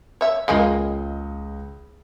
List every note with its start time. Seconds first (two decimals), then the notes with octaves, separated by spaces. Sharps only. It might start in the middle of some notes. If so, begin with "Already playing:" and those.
0.21 C#5 E5
0.48 C#2 C#3 G#3 A#3 D#5